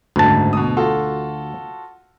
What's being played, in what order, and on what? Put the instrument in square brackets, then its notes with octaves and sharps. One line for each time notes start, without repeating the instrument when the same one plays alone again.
[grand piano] F#1 G#2 [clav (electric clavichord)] D2 A5
[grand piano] B2 D#6
F4 F#4 A4